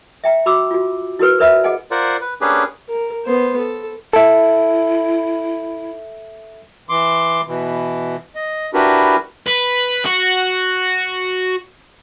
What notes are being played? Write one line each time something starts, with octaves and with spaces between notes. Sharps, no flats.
E5 G5 A#5
F#4 B5 D6 E6
F4 F#4
E4 F#4 A#4 B4
A#4 B4 D5 E5 B5
G#4 D#5 F#5 G#5
F4 A#4 C5 D5 F#5
B4
A#3 C#4 D4 G4 G#4 B4
A#4
B3 C5
A4
E4 A4 E5
E3 C6 D6
B2 E3
D#5
D4 E4 F#4 G4 A#4 B4
B4
F#4